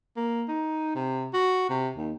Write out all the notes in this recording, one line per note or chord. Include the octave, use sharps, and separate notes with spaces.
A#3
D#4
C3
F#4
C3
D#2